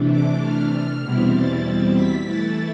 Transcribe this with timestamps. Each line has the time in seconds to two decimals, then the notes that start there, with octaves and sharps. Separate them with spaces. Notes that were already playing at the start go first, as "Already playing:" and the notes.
Already playing: C3 E3 A3 D4
0.10 D6
0.42 F6
1.03 E2 B2 G3 C4 E4
1.34 A6
1.95 B6
2.26 E3 A3 E4 A6